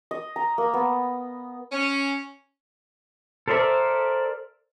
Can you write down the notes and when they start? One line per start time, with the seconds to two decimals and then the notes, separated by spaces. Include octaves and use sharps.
0.11 D#5
0.36 A#5
0.58 A#3
0.73 B3
1.72 C#4
3.48 A4 A#4 C5 D5 E5